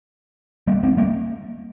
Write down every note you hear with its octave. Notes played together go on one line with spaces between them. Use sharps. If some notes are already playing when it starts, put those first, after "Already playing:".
G3 A#3
G#3 C4
G3 A#3